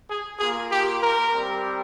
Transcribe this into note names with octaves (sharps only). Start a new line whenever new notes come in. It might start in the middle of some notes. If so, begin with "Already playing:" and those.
G#4
A#3 F4 G#4
G4
A#4
G3 C4 G4